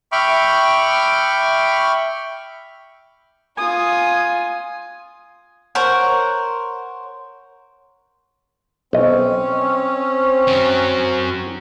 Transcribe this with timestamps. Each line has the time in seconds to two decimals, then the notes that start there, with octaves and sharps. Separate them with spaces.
0.12 E5 G5 B5 C#6 D6 F6
3.58 F4 G#5 D#6
5.75 A#4 C5 C#5 F#5
8.93 B1 C4 C#4 D#5
10.47 F#2 F#3